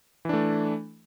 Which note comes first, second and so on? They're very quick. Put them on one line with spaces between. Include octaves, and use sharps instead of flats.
E3 D4 A3